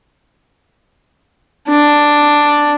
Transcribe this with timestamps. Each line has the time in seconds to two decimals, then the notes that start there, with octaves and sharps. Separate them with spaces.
1.69 D4